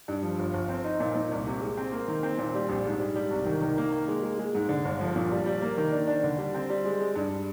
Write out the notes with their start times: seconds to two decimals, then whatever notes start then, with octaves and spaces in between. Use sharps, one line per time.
0.08 G2
0.23 F3
0.39 G1
0.54 G1
0.69 C4
0.84 D#4
1.00 A#2
1.15 A#2
1.31 C2
1.47 C3
1.61 G#3
1.78 C4
1.92 A#3
2.08 D#3
2.23 C4
2.38 A#2
2.55 G3
2.69 A#1
2.85 G#2
3.00 G3
3.15 G3
3.31 C2
3.46 D#3
3.61 D#3
3.78 A#3
3.92 A#3
4.08 G#3
4.23 G#3
4.39 G#3
4.55 G#2
4.69 D3
4.85 G1
5.01 F3
5.16 A#2
5.32 G3
5.46 G3
5.61 A#3
5.78 D#3
5.92 D4
6.08 D4
6.23 D3
6.38 G3
6.54 C4
6.70 G3
6.85 G#3
7.00 G#3
7.15 G2